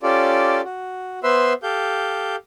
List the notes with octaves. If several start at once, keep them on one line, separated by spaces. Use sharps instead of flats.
C#4 F4 G4 A4 D5
F#4
B3 B4 C5 E5 C6 E6
G4 A4 F5 G6